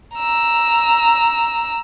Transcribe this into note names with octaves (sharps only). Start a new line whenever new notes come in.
A#5 E6